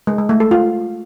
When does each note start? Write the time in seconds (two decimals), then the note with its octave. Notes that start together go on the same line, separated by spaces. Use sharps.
0.07 G#3
0.18 G#3
0.29 A3
0.40 A4
0.51 F4